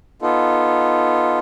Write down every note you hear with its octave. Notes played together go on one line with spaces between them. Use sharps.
B3 D#4 F4 A4